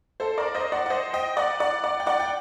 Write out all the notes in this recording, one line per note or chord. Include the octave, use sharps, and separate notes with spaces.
A4 C5
A#4 D5
C5 D#5
D5 F#5
F#5
C5 D#5
D#5 G5
D5 F#5
D5 F#5
D5 F#5
G5
D5 F#5
G5